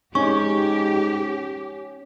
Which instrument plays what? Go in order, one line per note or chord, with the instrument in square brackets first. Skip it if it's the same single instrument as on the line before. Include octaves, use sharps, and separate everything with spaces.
[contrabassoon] G#2 [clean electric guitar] C#4 [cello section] G4 [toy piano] C#6